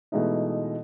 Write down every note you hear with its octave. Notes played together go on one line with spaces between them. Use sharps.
B2 E3 G#3 A3 D#4